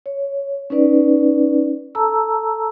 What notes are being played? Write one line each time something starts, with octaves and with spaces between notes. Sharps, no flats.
C#5
C#4 D#4 B4 D5
A4 A5 A#5 E6